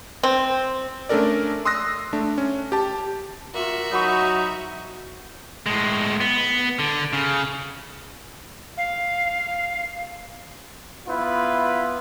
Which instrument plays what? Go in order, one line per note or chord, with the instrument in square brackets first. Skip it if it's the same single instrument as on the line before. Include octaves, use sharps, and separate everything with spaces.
[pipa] C4
[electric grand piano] A3 C#4 D4 A4 A#4 D5
C6 D#6 E6 F#6 A#6
A3 D4
C#4
G4 A5
[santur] A#3 F4 [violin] F#4 E5
[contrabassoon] F#3 [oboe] D#4 [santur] B5 C#6
[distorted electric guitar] A2 G#3
B3
D3
C#3
[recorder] F5
[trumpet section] B3 E4 F4 B4